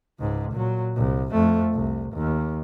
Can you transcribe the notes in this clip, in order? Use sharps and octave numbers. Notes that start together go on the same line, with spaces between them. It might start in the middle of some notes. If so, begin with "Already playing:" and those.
C#2 G#2
A#2 F#3
C2
F2 A3
C2
D#2